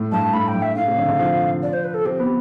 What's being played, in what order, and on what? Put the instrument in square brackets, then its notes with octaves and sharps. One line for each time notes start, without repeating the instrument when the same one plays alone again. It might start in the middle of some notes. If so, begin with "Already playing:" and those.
Already playing: [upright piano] A2
[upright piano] G2 [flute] A5
[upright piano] A2 [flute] B5
[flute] G5
[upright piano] G2
[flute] E5
[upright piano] A2 [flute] F5
[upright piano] C3
D3
D3
F3
[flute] D5
C5
B4
A4
[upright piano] C4 [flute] G4
[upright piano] B3